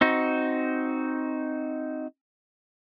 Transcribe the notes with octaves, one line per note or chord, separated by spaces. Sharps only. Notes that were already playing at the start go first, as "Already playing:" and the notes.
C4 D#4 F#4